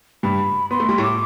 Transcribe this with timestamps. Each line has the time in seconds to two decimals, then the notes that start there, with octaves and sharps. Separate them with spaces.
0.23 G2 G3 B5
0.71 B3 C6
0.80 A3
0.89 G3
0.98 A2 A3
1.03 D6